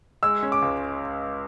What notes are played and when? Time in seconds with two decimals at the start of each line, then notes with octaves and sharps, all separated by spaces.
0.23 G#3 E6
0.43 C#4
0.52 D6
0.62 C#2